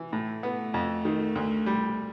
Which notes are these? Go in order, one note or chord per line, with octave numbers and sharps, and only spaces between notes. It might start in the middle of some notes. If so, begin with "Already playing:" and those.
Already playing: E3
A2 A3
B3
F2
D#3
D2
G3